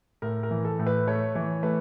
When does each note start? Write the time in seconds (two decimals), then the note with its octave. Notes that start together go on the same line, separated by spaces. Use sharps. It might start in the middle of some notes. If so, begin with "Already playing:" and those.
0.22 A2 A#4
0.43 A#4
0.51 E3
0.65 A4
0.79 A2
0.87 B4
1.07 A3 C#5
1.35 E3 C#5
1.63 A3 B4